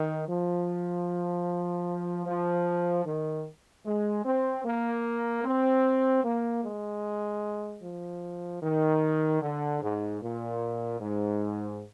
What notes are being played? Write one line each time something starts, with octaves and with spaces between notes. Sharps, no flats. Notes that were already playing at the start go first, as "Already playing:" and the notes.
Already playing: D#3
F3
F3
D#3
G#3
C4
A#3
C4
A#3
G#3
F3
D#3
D3
G#2
A#2
G#2